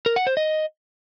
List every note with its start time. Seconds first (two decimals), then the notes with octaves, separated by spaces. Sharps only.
0.06 A#4
0.16 F#5
0.27 C5
0.37 D#5